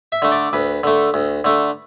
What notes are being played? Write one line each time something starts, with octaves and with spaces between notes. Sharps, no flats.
E5
D3 A3
D5
D2 B4
D3 A3
D2
D3 A3